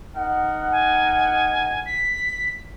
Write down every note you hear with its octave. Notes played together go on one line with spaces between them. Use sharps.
D#4 A#4 F#5
G#5
B6